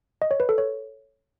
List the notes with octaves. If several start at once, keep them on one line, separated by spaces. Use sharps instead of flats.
D#5
C#5
B4
A4
C#5